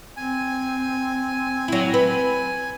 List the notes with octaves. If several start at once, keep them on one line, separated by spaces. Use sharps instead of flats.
C4 G#5
F#3 E4
B4